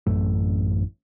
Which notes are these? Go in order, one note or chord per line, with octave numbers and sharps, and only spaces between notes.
A1 F#2 A3